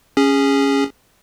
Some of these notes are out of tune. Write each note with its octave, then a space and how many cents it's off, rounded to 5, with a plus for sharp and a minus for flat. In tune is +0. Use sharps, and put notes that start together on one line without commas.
C#4 +0 G#4 -20